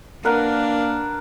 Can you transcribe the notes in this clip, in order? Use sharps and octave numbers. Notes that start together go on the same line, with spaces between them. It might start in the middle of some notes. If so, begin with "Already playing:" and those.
A#3 D4 A#4 B4 F#5